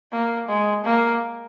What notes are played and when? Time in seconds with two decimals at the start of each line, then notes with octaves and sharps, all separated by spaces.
0.13 A#3
0.48 G#3
0.84 A#3